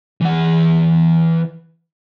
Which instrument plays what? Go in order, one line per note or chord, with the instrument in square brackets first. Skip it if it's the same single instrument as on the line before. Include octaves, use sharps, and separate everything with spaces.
[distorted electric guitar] E3 F#5